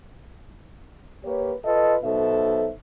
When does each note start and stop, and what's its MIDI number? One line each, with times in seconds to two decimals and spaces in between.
1.24 1.52 58
1.24 1.52 67
1.24 1.52 71
1.24 1.52 73
1.65 1.95 65
1.65 1.95 69
1.65 1.95 71
1.65 1.95 75
2.04 2.69 35
2.04 2.69 47
2.04 2.69 63
2.04 2.69 69
2.04 2.69 72
2.04 2.69 76